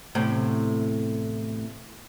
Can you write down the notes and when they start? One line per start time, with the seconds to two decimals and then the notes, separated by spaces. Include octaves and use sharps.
0.15 E2 A2 C3